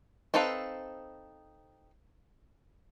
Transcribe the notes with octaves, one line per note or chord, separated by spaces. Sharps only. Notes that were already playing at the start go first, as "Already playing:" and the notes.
C4 D#4 A4 B4 F5